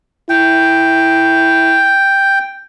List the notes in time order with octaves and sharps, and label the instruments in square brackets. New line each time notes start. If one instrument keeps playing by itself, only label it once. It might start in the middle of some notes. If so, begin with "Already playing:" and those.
[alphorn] E4 [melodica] G5